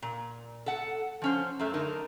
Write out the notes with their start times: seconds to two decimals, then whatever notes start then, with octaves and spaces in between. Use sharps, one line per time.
0.02 A#2
0.66 A4 F#5
1.22 F3 C#4 C5
1.59 F#2 A3
1.74 D3 D#4 A#4